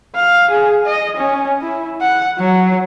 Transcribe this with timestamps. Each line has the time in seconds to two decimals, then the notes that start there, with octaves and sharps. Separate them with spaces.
0.16 F5
0.51 G#4
0.86 D#5
1.17 C#4
1.62 E4
2.01 F#5
2.39 F#3